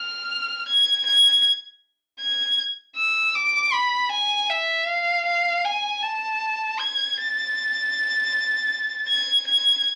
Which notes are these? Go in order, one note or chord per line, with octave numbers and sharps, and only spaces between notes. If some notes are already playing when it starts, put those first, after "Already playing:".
Already playing: F6
G#6
G#6
G#6
E6
D6
B5
G#5
E5
F5
F5
G#5
A5
G#6
A6
G#6
G#6